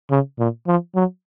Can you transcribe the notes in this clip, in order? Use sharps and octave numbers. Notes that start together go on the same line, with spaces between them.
C#3
A#2
F3
F#3